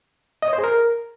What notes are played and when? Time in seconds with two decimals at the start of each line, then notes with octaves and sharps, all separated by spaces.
0.42 D#5
0.48 C#5
0.53 C5
0.58 G#4
0.64 A#4